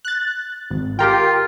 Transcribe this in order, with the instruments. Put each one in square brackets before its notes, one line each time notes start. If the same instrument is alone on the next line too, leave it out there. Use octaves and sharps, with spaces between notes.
[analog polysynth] F#6 A6
G#1
[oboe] F4 [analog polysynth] G4 A#4 G5